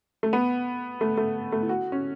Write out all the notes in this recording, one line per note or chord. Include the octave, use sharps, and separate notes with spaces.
A3
B3
A3
A3
A3
E4
F#4
C#4